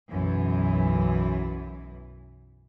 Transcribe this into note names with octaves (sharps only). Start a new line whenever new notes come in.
B1 F#2 E3